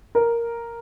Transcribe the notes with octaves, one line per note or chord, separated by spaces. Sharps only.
A#4